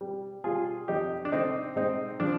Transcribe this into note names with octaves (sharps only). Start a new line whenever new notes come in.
G3
G3 F4 G#4
F2 D#4 G4
D4
D3 C4 D#4
G#2 C4 D#4
F3 D4